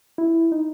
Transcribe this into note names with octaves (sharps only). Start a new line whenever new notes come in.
E4
D#4